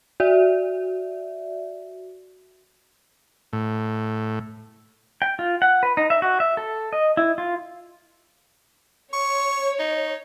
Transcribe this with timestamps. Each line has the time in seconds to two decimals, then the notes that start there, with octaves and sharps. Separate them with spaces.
0.20 F#4 D5 E5
3.53 A2
5.22 G5
5.39 F4
5.62 F#5
5.83 B4
5.97 D#4
6.10 E5
6.22 F#4
6.40 E5
6.57 A4
6.93 D#5
7.17 E4
7.38 F4
9.13 C#5 C#6
9.79 D#4